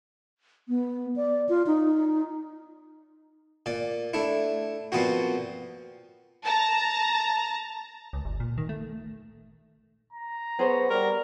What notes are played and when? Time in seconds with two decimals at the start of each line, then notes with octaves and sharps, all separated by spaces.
0.69 B3
1.16 D5
1.49 F4
1.67 D#4
3.66 A#2 D5
4.14 A3 D4 E4
4.92 A#2 F3 B3 C4 F#4
6.44 A5 A#5
8.13 C#2
8.25 G1
8.40 A#2
8.58 D#3
8.69 A3
10.13 A#5
10.59 B3 G#4 C5 C#5
10.90 G3 A#4